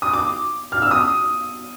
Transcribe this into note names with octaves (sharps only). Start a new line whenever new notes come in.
D#6
D6
F6
E6
D#6